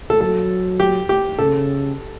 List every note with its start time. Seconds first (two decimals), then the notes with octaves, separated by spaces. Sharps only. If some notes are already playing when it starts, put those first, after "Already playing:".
0.10 A4
0.21 F#3 A4
0.80 G4
1.09 G4
1.39 C#3 A4